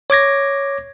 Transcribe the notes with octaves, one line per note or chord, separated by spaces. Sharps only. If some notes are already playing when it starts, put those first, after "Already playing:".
C#5 D6 G#6 A#6